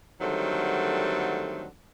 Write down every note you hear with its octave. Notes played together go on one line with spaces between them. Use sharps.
D3 D#3 F#3 G3 A3 C4